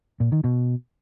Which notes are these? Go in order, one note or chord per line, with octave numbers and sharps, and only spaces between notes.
A#2
D#3
B2